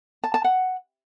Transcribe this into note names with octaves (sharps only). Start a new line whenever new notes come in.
A5
A5
F#5